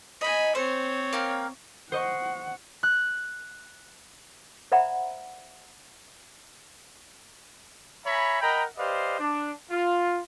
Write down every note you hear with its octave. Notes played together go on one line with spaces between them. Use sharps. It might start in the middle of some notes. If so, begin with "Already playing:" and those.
D#4 D#5 G#5 B5
C4 C5 C#5
A#3 F5 G5
C5 D#5 F#5 C#6
F#6
C5 D5 E5 F#5 A#5 B5
C#5 E5 G#5 A#5 B5
A#4 D#5 F#5 G5 A#5 B5
G4 B4 C5 D5 D#5 F5
D4
F4